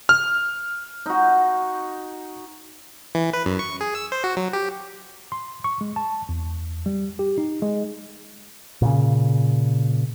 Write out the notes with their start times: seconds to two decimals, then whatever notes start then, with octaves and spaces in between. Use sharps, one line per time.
0.09 F6
1.06 D#4 F#4
3.15 E3
3.33 B4
3.46 F#2
3.59 C#6
3.81 G#4
3.95 E6
4.12 C5
4.24 F#4
4.37 F#3
4.53 G4
5.32 C6
5.64 C#6
5.81 G#3
5.96 A5
6.29 E2
6.86 G3
7.19 G4
7.38 D#4
7.62 G#3
8.82 A#2 C#3